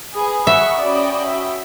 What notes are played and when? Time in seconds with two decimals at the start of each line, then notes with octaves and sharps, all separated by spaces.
0.14 G#4 B4 B5 D#6
0.47 E5 F#5 C#6
0.80 C#4 F#4 D5 G5
1.25 E5